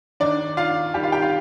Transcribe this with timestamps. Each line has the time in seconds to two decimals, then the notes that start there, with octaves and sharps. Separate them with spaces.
0.20 D#2 D#3 D4 D5
0.57 F4 F5
0.94 D#2 D#3 G3 G4
1.03 F4 F5
1.12 G4 G5
1.22 F4 F5